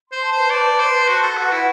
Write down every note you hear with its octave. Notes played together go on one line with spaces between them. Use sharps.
C5 C6
A5
B4 C5
D5 A5
B4
B4 C5
C6
F#4 A5
A4 B4
F#4 F#5
E4 B4